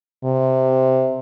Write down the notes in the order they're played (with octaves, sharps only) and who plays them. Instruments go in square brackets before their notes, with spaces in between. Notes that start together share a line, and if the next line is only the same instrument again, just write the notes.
[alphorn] C3